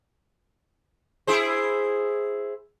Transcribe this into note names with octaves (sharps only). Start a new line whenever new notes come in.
E4 G#4 C5